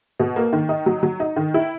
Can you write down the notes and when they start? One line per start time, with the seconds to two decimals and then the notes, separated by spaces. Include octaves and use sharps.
0.19 B2
0.36 A#3
0.53 D#3
0.69 D#4
0.86 F#3
1.03 F#3
1.20 D#4
1.36 D#3
1.54 E4